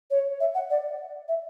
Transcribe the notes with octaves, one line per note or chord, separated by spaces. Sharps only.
C#5
E5
F#5
D5
E5